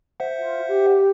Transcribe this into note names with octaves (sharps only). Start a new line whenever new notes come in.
C5 E5 F#5
F4
G4